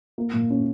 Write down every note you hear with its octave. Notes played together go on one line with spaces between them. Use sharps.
A#3
A#2
C#4